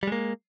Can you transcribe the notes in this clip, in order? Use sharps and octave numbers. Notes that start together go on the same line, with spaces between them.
G3 G#3 A#3